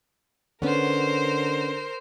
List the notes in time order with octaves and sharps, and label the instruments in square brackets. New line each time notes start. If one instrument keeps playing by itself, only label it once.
[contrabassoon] D3 [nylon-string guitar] B3 C#4 [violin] A#4 C5